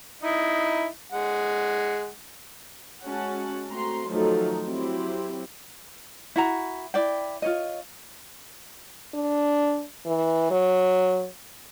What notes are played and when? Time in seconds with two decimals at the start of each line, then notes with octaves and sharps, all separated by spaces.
0.23 D#4 E4 D#5
1.12 G#3 F#5
3.04 G#3 C#4 F#4 F#5 A5
3.70 A3 C4 F#4 A#5 C6
4.10 D#3 F3 F#3 A3 D#4 A4
4.64 F#3 C4 E4 G4
6.36 E4 F#4 A#5
6.94 E4 D5 G5
7.42 F4 C#5 D#5
9.15 D4
10.06 E3
10.51 F#3